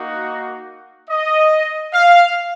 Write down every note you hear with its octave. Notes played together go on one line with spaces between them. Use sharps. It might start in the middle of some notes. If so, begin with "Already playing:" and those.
Already playing: A#3 D#4 F#4
D#5
F5